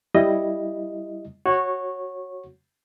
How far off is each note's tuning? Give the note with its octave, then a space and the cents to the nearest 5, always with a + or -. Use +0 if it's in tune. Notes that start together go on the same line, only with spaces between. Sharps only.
G3 +0 E4 +0 D#5 +0
F#4 +0 C#5 -15